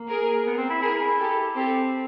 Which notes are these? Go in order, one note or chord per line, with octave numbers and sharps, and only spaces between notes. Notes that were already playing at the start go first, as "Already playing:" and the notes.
Already playing: A#3
G#4 A#4
B3
C4
E4
E4 G#4 A#4
G4 A4
C4 G4 A4